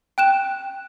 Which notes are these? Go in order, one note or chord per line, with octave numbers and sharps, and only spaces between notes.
G5 F#6 E7